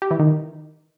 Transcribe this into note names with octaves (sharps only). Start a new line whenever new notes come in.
G4
E3
D#3